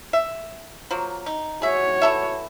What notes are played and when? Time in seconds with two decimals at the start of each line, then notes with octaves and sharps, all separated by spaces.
0.13 E5
0.91 F3 F#3 A#3
1.26 D#4
1.62 F#4 G#4 C#5 E5
2.02 E3 A4 E5